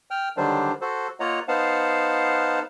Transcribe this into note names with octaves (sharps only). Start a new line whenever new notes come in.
G5 F6
D3 D#3 F#3 G3 D4 C5
F#4 A4 C5
A#3 F4 C#5 D#5 F#5 A#5
B3 D#4 C5 F5 F#5 A5